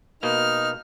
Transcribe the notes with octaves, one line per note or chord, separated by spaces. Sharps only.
B2 A#3 D#4 F6